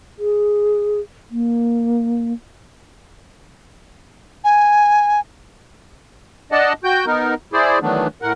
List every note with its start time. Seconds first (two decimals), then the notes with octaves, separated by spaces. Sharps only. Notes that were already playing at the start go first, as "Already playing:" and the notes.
0.19 G#4
1.31 A#3
4.44 G#5
6.52 D4 D5 D#5 F#5 A5
6.84 F#4 G5 G6
7.06 B3 D#4 A#4
7.53 E4 G#4 C5 D5
7.82 D#3 E3 F#3 A3 B3 D4
8.22 A2 A#4 F#5